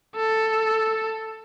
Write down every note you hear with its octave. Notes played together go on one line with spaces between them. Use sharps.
A4